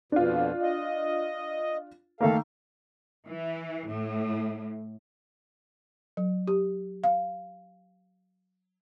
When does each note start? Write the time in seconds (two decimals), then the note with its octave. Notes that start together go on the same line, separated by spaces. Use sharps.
0.12 F2 B2 D4 F4
0.62 D#5
2.21 D#3 A3 A#3 A4 F5
3.27 E3
3.89 A2
6.17 F#3
6.48 G4
7.04 F5